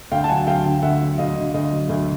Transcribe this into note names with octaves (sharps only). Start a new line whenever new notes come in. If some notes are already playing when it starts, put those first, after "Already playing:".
D2 F5 G5
A5
F#3 F#5 G#5
D2 F5 G5
D3
D2 E5 F#5
F#3
D2 D#5 F5
D3
D2 D#5
F#3
D2